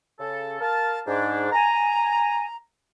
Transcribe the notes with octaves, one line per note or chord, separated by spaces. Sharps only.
C#3 A4
A#4 F5 A5
G#2 D4
G#5 A#5